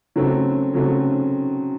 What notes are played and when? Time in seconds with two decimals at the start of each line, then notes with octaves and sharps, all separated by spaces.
0.16 C#3 F#3 A3 C4
0.73 C#3 F#3 A3 C4